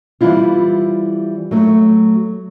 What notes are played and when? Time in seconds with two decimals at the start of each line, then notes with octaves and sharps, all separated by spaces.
0.21 E3 G3 C4 E4 F4
1.51 F#3 A3